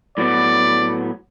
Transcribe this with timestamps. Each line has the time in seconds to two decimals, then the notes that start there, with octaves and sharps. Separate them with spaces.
0.18 A2 F#3 B3 D5